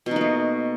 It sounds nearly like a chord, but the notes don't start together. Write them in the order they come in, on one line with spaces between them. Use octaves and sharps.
B2 D#4 A#3 A3